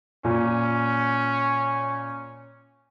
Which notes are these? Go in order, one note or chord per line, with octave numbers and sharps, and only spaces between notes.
A#2 C#4